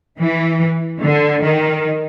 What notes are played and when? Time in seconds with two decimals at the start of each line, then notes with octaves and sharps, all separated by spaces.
0.20 E3
1.01 D3
1.42 D#3